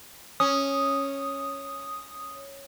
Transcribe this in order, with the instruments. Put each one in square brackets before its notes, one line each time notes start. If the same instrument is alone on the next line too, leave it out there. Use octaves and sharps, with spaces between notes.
[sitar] C#4 [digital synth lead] D#6